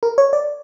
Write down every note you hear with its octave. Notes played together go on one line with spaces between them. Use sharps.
A#4
C#5
D5